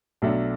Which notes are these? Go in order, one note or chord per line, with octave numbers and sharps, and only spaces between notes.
B1 B2 F#3 A3 D4